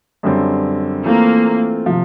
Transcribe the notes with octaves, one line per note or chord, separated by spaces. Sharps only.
F#2 D3 G3 C4
E3 A3 A#3 C4 F4
C3 F3